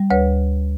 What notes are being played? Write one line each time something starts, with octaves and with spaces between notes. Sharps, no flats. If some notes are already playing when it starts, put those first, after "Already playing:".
Already playing: G3
D2 B4 C#5